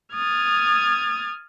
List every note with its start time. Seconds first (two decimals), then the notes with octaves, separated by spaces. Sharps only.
0.15 D#6 F6 G#6 A6